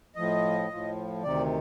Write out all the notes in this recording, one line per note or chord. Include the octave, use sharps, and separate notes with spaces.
A2 F3 D#5
A2 F3
D2 C3 D#3 D5